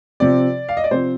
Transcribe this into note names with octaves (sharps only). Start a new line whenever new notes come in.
C3 F3 C4 D5
F5
D#5
D5
C3 F3 C4 C5